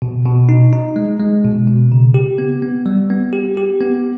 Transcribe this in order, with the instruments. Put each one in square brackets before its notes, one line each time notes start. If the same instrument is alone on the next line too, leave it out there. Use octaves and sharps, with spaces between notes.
[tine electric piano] B2
B2
D#4
D#4
G#3
G#3
B2
B2
C#3
G4
B3
B3
G3
B3
G4
G4
B3